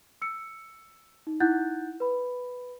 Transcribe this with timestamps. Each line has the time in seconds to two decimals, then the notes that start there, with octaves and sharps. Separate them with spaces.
0.22 E6 C#7
1.27 D#4
1.40 D#4 E4 F#5 F#6 G6 A6
2.00 B4 B5